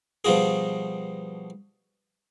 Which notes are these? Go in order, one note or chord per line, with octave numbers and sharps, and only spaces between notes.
B2 F3 G3 F4 F#4 G#4